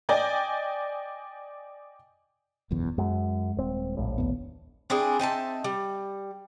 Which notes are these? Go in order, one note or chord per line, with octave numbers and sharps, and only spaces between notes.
D5 D#5 G5 G#5
F#1 B1 E2
F#2 G#3
D#1 C4
F1 A#1 A2
D#2 B3
C4 D4 E4 G#4
C4 D#4 E5 A5
G3